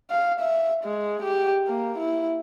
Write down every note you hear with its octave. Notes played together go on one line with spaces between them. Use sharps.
F5
E5
G#3
G4
A#3
E4